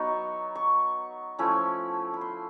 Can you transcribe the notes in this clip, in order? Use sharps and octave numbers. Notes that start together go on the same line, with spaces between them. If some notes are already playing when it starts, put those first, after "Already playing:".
Already playing: F#3 B3 D#4 C#6
C#6
F3 A3 C#4 E4
B5
C6